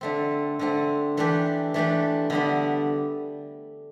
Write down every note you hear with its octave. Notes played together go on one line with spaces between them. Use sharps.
D3 A3 C4
D3 A3 C4
E3 A3 D4 G4
E3 A3 D4 G4
D3 G3 B3 D4